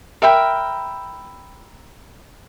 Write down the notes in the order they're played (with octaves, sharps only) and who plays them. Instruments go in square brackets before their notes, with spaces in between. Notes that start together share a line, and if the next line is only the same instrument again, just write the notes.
[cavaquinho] A#4 E5 G5 B5